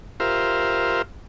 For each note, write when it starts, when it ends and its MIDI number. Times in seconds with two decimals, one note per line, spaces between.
0.20 1.02 65
0.20 1.02 67
0.20 1.02 70
0.20 1.02 72
0.20 1.02 76
0.20 1.02 77